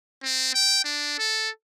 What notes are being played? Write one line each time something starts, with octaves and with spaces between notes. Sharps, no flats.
C4
G5
D4
A4